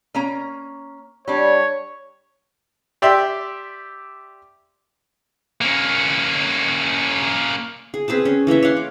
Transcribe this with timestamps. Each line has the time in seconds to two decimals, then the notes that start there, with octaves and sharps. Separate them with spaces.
0.14 A#3 C#4 A#5
1.28 G3 D4 C#5
3.02 G4 D5 E5 G5 C6
5.61 A#3 C#4
7.94 G#4
8.08 C4 G#4 B4 A5
8.25 C#4
8.47 E3 A#3 C#5 E5
8.63 C#5 F5 F#5 C6
8.77 D6